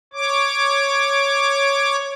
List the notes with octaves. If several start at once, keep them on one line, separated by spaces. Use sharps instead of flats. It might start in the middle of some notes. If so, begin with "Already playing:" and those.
C#5 D6